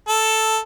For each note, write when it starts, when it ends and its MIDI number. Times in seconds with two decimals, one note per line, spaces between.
0.08 0.58 69